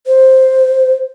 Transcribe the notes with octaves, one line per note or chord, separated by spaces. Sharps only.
C5